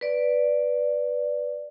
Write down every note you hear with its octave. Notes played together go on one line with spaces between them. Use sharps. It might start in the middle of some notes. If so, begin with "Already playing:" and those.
B4 D5